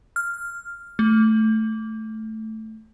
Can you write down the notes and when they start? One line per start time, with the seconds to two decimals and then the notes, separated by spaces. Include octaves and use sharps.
0.16 F6
0.99 A3